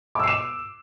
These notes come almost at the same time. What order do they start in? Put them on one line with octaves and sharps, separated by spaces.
D6 E6 C7 E7